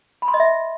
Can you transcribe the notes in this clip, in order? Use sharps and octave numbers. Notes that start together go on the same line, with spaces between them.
B5
C6
D#5
E5